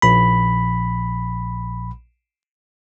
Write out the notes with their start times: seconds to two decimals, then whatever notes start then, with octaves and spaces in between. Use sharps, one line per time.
0.02 A#1 B5